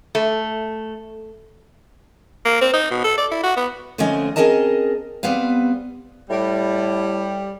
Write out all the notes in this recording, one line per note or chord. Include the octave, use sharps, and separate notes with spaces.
A3
A#3
C4
D#4
B2
A4
D5
E4
F#4
B3
D3 F3 A3 C4 C#4 D#5
C4 C#4 G#4 A#4 D#5 A5
G3 B3 C4 B4 F5
A2 G3